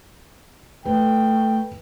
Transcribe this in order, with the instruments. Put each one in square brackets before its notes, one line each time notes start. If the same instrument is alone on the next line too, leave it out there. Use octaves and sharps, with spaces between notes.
[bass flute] A3 [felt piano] B4 [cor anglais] G5